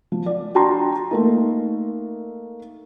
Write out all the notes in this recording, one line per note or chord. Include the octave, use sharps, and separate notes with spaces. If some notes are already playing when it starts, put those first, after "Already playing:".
F3
D5
D4 F#4 G5 A5 A#5 C6
A3 A#3 D#4